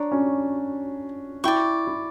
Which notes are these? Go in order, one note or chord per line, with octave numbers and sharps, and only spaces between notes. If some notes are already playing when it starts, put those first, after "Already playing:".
Already playing: D4 C#5 A#5 D6
C#4
E4 D5 G5 C#6
E4